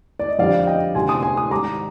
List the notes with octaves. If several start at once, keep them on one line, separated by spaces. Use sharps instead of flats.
D5
D#5
F2 D3 G3 D5 F5
D#5 G5
D2 C3 G3 G#5 C6
C6 D#6
G#5 C6
C6 D#6
G#1 G#2 D#3 G3 A#5 D6